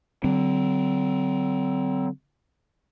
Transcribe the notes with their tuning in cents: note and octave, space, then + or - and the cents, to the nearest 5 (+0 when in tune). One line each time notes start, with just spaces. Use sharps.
D3 +0 F#3 +40 C4 -20